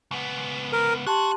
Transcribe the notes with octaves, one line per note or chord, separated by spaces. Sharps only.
C#2 B3
A#4
F#4 G4 A5 C6 F#6